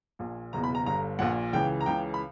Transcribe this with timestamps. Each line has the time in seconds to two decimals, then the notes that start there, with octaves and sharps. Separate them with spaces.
0.19 A#1 A#2
0.53 F#1 E2 B2 A#5
0.64 B5
0.75 A#5
0.86 G1 G2 D3 A#5
1.19 A#1 A#2 F#5
1.53 C#2 C#3 E3 G5
1.81 A#5
1.86 C#2 C#3 E3 G5
2.14 B5